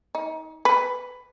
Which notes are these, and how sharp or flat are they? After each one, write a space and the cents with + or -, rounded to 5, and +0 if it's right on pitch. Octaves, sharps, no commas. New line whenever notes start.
D#4 +30
B4 +15